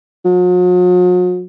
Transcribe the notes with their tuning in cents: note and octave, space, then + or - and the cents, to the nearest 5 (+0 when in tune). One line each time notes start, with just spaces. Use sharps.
F#3 -45